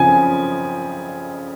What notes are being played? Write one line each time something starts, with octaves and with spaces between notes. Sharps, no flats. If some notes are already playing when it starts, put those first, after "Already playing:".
Already playing: C#3 F3 C4 G#5